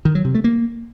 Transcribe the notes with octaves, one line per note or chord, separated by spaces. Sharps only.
D#3
F#3
C3
A3
A#3